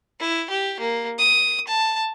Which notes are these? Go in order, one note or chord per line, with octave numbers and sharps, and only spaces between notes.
E4
G4
A#3
D#6
A5